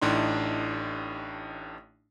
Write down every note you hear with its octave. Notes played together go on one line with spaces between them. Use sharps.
A1 A2 D4 D#4 C6